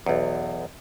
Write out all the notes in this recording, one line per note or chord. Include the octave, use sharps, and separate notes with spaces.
B1 E2